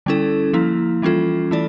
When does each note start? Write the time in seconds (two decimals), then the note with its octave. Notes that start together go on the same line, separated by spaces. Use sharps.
0.06 D3 G3 C#4 E4 A4
0.53 F3 A#3 E4
1.02 E3 G3 C#4 F4 A4
1.51 E3 A3 E4 A4 D5